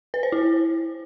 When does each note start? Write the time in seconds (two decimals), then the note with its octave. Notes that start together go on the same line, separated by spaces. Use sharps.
0.14 B4
0.23 C5
0.32 E4